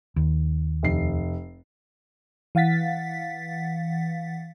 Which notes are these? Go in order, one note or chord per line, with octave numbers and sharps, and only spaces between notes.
D#2
F1 C7
E3 F5 F#5 A6 B6